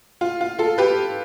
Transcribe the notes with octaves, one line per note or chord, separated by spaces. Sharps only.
F4
F4
F4 A4
G4 B4